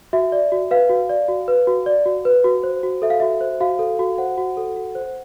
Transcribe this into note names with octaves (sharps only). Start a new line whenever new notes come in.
F#4 E5
D5
F#4
B4 F5
F#4
D5
F#4
B4
F#4
D5
F#4
B4
F#4
C5
F#4
A4 E5
F5
F#4 E5
C5
F#4 F5
A4
F#4
C5 F#5
F#4
A4
F#4
C5